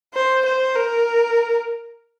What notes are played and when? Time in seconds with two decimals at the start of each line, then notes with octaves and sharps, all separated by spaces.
0.14 C5
0.45 C5
0.75 A#4